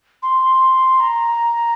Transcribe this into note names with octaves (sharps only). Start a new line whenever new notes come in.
C6
A#5